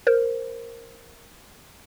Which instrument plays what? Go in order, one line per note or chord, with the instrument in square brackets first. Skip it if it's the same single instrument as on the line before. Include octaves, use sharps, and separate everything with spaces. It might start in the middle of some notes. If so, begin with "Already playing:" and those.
[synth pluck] A#4 C5